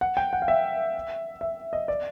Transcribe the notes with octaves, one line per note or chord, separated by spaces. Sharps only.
F#5
G5
F#5
F5
E5
E5
D#5
D5